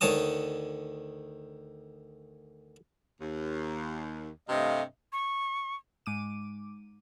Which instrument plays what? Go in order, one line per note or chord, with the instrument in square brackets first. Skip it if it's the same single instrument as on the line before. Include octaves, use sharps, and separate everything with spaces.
[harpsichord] D2 D#3 C#5 A5 D#6
[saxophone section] D#2
[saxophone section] G2 C3 [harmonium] A3 D#5 F5
[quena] C#6
[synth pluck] G#2 D6 D#7